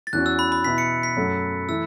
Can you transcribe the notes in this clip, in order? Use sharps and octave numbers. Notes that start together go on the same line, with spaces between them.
A6
E2 E3 C#4 F#4 F#6
E6
B5
B5
B2 B3 E4 B6
C#7
B6
F#2 F#3 A3
E3 A3 E4 E6